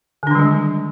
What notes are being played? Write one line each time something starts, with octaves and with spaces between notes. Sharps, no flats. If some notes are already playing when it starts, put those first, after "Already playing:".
D3 D#3 G3 G#3 D4